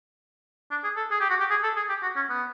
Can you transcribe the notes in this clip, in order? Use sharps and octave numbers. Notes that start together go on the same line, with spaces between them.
D4
G#4
A4
G#4
G4
F#4
G4
G#4
A4
G#4
G4
F#4
C#4
B3